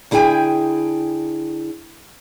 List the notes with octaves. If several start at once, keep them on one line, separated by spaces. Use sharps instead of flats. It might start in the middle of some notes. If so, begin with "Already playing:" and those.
D3 E4 G#4 B4 G5 G#5